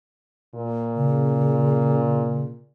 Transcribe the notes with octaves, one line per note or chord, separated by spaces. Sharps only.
A#2
C#3